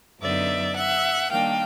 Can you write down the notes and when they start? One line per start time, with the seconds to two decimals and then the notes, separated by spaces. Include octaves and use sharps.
0.21 F#2 D3 F#3 B3 D#4 D5 E5
0.76 E5 F#5
1.31 D#3 G3 A#3 D4 F5 G5